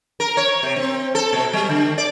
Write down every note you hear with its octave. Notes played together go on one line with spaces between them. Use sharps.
A#4
C#5
C3
C4
A4
B2
G3
D3
D5